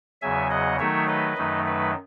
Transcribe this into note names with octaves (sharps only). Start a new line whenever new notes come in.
E2 C#3 F#3 E5 G#5
D#5 F#5
D#3 F#3 A3 D#4 C#5 E5
B4 D#5
F#2 D#3 F#3 A3 D#4
B4